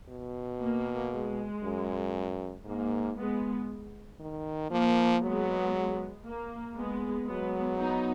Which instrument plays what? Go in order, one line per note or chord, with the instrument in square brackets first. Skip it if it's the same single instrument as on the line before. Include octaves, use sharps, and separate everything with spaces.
[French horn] B2
[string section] A#3
G#3
[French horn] F#2
[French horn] G#2 [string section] A#3
[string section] G#3 B3
[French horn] D#3
[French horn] F3 [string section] A#3
[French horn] F#3 [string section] G#3 B3
[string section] A#3
G#3 B3
[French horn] F#3 [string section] G#3 B3
[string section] B3 D#4